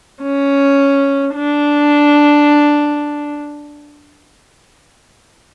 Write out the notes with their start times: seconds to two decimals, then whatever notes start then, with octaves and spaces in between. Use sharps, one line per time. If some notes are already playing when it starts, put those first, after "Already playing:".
0.23 C#4
1.35 D4